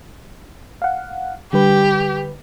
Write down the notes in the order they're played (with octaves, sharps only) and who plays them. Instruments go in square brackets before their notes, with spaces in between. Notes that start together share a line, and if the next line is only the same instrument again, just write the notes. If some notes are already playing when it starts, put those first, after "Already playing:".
[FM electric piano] F5 F#5
[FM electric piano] D3 G3 B4 [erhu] G4